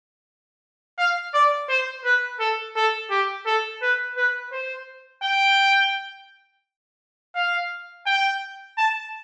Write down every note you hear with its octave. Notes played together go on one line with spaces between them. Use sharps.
F5
D5
C5
B4
A4
A4
G4
A4
B4
B4
C5
G5
F5
G5
A5